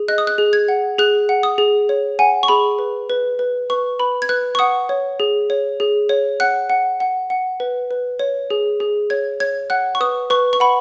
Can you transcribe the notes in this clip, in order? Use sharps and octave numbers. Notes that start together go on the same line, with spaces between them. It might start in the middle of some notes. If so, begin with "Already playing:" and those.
Already playing: G#4
D#5 F#6
D#6
F#6
G#4
G#6
F#5
G#4 F#6
F#5
D#6
G#4
C#5
F#5 G#5
C#6
G#4 B5
B4
B4
B4
B4 C#6
B4 B5
G#6
B4 F#6
C#6
F#5 D#6
C#5
G#4
C#5
G#4
C#5
F#5 F#6
F#5
F#5
F#5
B4
B4
C#5
G#4
G#4
C#5 G#6
C#5 G#6
F#5 F#6
C#6
B4 D#6
B4 C#6
C#6
F#5 B5